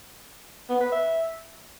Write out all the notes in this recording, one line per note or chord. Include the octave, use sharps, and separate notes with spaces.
B3
B4
E5